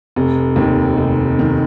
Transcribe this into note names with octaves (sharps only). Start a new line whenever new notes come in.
F1
D#2 D#3
F1
D#3